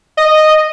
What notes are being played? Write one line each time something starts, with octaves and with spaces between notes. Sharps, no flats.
D#5